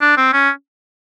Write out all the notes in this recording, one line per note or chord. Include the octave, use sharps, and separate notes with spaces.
D4
C4
C#4